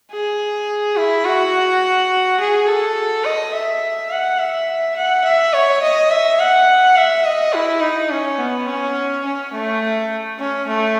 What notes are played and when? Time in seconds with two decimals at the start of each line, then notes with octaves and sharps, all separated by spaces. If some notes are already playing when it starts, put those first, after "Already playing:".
0.11 G#4
0.97 E4
1.25 F#4
2.40 G#4
2.67 A4
3.25 D#5
3.54 E5
4.11 F#5
4.39 E5
4.97 F#5
5.24 E5
5.53 C#5
5.82 D#5
6.11 E5
6.39 F#5
6.97 E5
7.25 D#5
7.54 E4
7.82 D#4
8.10 C#4
8.38 B3
8.67 C#4
9.25 C#4
9.53 A3
10.39 C#4
10.68 A3